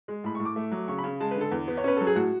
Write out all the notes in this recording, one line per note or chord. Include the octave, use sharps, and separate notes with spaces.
G#3
A2 B5
C#6
A2
D6
A3
F#3
C#3 C#6
B5
C#3
G#3 A5
B4
D3
A4
E2
B3
C#5
C#4 B4
F#3 A4
G#4
A2 F#4